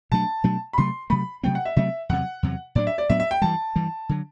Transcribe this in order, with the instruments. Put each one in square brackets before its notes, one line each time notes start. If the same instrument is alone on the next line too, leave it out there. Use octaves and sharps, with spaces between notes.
[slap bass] B2 F#3 A3 D4 [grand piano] A5
[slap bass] B2 F#3 A3 D4
[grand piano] B5
[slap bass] C3 F#3 A3 [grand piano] C6
[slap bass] C3 F#3 A3 [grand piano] B5
[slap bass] C3 F#3 A3 C4 [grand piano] G5
[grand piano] F#5
E5
[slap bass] C3 F#3 A3 C4 [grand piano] E5
[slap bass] E2 C3 F#3 [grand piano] F#5
[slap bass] E2 C3 F#3
[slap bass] A2 F#3 B3 D4 [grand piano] D5
[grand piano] E5
D5
[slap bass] A2 F#3 B3 D4 [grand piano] E5
[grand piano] E5
G5
[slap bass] G2 E3 G3 [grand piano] A5
[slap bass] G2 E3 G3
D3 F#3